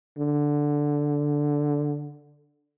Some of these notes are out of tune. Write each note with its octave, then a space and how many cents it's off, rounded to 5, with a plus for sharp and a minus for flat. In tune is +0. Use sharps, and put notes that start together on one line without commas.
D3 +0